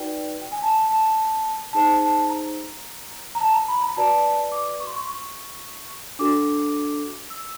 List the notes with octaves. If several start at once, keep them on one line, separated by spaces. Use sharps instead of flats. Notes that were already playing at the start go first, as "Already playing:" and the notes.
Already playing: D#4 F#4 B4 D5 G5
G5
G#5
A5
A5
D#4 G#4 C5 A5
A5
A#5
A#5
A5
A#5
B5
A#5
F#4 B4 D5 A5
D6
C#6
C6
C#6
C#6
D4 F#4 A4 D6
E6